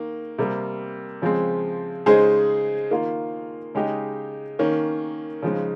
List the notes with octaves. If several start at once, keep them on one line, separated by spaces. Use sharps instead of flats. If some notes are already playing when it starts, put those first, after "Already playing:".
Already playing: D#3 A#3
C3 G3 A#3
C#3 F3 G#3 C4
C#3 G#3 D#4 G#4 C5
D#3 A#3 F4
C#3 G#3 D#4 G4
D#3 A#3 C#4
C#3 F3 G#3 D#4